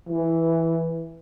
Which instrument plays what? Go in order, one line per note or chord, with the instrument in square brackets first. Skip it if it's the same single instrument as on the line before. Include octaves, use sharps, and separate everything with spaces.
[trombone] E3